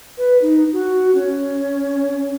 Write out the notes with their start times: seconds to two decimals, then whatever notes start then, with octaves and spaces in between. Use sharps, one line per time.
0.18 B4
0.42 D#4
0.73 F#4
1.15 C#4